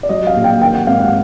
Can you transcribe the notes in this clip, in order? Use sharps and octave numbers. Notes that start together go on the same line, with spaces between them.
D5
F#3 D#5
F5
A#1
G5
D#3 G5
F#5
G#1 F5
F#5